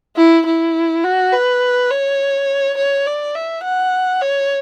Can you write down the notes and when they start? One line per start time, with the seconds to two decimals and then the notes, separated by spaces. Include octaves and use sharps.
0.17 E4
0.46 E4
1.04 F#4
1.33 B4
1.91 C#5
2.77 C#5
3.06 D5
3.35 E5
3.64 F#5
4.22 C#5